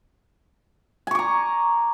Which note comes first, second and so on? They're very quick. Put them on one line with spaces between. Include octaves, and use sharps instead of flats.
G#5 C#6 D6 A#5